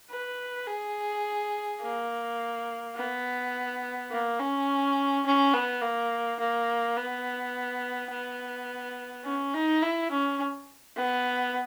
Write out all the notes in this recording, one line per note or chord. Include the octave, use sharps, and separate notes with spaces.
B4
G#4
A#3
B3
A#3
C#4
C#4
B3
A#3
A#3
B3
B3
C#4
D#4
E4
C#4
B3